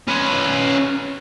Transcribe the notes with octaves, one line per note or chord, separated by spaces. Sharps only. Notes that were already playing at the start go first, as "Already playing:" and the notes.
C#4 B4